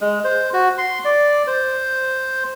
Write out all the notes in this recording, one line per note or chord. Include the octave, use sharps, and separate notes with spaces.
G#3
C5
F#4
C6
D5
C5